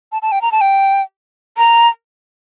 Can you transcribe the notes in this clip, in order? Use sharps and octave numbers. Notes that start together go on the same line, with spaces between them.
A5
A5
G5
A#5
A5
G5
A#5